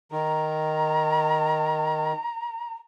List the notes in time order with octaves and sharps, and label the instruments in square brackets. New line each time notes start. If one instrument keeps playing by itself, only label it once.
[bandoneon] D#3 [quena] A#5